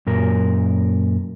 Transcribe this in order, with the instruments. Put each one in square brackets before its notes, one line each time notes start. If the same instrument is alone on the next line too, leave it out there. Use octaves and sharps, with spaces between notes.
[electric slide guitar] F#2 A#2 A#4